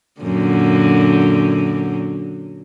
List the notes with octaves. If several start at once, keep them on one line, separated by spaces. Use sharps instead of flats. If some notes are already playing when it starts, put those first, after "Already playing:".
F#2 A#2 D3